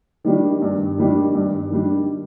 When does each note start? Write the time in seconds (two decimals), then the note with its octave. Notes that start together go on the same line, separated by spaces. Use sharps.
0.24 D#3 G3 D4
0.62 G2
0.98 D#3 G3 D4
1.35 G2
1.71 D#3 G3 D4